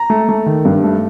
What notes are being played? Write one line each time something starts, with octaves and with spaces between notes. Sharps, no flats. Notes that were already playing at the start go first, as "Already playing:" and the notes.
Already playing: A#5
A3
A3
D#3
G2
A3